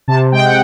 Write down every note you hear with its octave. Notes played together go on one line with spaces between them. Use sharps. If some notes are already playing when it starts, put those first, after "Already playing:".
C3 A5
G#3 G5
F#5